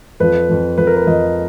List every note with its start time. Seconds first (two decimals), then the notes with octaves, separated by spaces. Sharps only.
0.20 F2 F3 B4
0.49 F2 F3
0.78 F2 F3 B4
0.87 A#4
0.97 B4
1.07 F2 F3 D#5